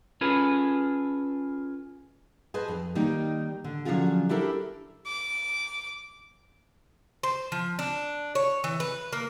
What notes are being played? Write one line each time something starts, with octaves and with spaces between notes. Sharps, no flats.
C#4 F4 G#4 A4 B4
G#4 B4 C5 D#5 G#5 A5
F2
D#3 G3 A#3 D#4
D3
D3 F3 F#3 C#4 F4 G#4
D4 E4 G4 A4 A#4
D6
C5
F3
D4
C#5
E3
B4
A#3